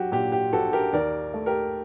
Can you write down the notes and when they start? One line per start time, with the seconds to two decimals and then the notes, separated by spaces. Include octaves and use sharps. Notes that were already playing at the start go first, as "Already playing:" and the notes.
Already playing: F#3 F#4 G4
0.12 A#2 G4
0.32 G4
0.53 A#1 F#4 A4
0.73 G4 A#4
0.93 D#2 A#4 D5
1.34 A3
1.46 G4 A#4